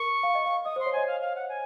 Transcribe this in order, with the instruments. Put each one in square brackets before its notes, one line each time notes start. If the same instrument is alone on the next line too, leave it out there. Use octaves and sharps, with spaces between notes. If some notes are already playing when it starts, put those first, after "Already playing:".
Already playing: [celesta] A#4 [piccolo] C#6
[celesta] F5
D#5
F5
[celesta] D#5 [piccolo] D#6
[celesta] C5 [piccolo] C6
[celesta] C#5
[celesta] D#5 [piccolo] G#5
[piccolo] F5
F5
F#5
G#5